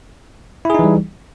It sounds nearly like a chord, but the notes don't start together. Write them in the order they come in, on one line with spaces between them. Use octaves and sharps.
E4 G#4 D#4 E3 G3